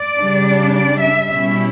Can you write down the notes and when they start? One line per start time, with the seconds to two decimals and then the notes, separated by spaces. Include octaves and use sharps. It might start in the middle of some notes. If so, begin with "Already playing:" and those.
Already playing: D5
0.18 C#3 G3 D4
0.74 D5
1.01 E5
1.30 B2 G3 C#4 E4 E5